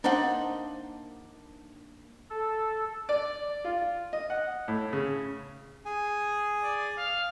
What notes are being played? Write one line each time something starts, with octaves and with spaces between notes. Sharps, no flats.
A#3 D4 D#4 C5 F#5
A4
D5
F4
D#5
F#5
A2
C#3
G#4 G#5
D5
F5